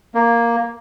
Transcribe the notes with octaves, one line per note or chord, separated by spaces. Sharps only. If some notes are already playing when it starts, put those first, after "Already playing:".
A#3